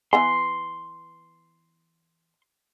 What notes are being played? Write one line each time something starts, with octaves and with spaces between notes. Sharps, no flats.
E3 B3 G#5 C6